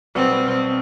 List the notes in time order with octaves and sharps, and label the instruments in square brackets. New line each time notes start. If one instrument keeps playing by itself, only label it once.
[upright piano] B1 B2 G3 B3 [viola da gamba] C4